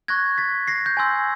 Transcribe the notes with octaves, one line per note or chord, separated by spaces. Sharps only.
C#6 F#6 G#6 A#6
A6 B6
A#6 C7
G6
G#5 C6 E6 G6 G#6